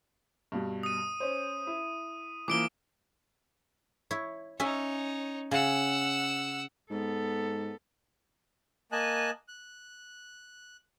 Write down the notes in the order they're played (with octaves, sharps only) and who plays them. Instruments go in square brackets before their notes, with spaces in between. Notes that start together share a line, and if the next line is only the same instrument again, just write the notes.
[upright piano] G2 B2
[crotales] D#6 D#7
[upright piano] C#4 C5
E4
[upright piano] E3 F3 A#3 [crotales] D6 D7 G7
[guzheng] E4 C#5
[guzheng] C#4 E5 G#5 [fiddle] D#4 C#5
[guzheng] C#3 [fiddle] F#5 E6
[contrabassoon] G#2 [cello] B3 A4
[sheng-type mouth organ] A#3 D#5 G#5 A5 F#6
F#6